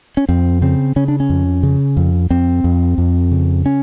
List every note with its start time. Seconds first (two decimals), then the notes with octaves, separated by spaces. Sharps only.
0.17 C#4
0.29 F2 C4
0.62 C#3 C4
0.96 C#3 C#4
1.08 D4
1.20 C#4
1.30 F2
1.63 C#3
1.97 F2
2.30 F2 C4
2.64 F2
2.98 F2
3.31 C#3
3.66 C#4